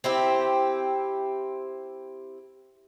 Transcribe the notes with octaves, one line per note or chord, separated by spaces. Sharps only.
C4 E4 G4